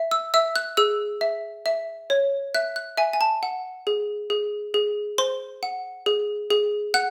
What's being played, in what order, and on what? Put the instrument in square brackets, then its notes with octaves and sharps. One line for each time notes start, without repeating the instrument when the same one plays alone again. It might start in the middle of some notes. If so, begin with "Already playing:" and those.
Already playing: [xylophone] E5
E6
E5 E6
F#6
G#4 E6
E5
E5
C#5
E5 F#6
F#6
E5 G#5
G#5
A5
F#5
G#4
G#4
G#4
C5 C6
F#5
G#4
G#4
F#5 F#6